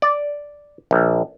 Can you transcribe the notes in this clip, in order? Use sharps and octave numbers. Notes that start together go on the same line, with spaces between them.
D5
A#1